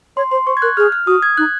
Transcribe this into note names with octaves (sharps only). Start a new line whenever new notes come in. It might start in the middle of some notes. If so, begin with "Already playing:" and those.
C#5 C6
C5 C6
C5 C#6
G#6
A#4 F#6
G#4 F6
F6
F#4 D#6
G#6
D#4 F#6